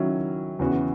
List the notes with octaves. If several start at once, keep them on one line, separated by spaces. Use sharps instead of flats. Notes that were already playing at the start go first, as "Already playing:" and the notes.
Already playing: D#3 F#3 C#4 E4
E2 C#3 E3 B3 F#4